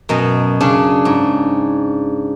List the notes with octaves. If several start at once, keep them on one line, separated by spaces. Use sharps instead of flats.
F#2 B2 D#5
C#3 C#4 D4
G#2